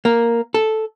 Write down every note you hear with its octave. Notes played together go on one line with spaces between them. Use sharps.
A#3
A4